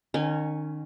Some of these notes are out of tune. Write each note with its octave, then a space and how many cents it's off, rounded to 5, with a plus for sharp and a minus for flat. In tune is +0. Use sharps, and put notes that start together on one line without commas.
D#3 -30 C#4 +0 G#5 -15